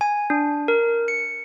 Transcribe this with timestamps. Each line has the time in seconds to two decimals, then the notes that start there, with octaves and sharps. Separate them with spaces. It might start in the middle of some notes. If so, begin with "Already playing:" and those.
0.01 G#5
0.30 D4
0.68 A#4
1.08 C#7